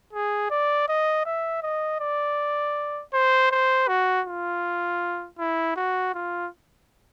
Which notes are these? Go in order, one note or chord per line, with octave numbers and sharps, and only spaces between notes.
G#4
D5
D#5
E5
D#5
D5
C5
C5
F#4
F4
E4
F#4
F4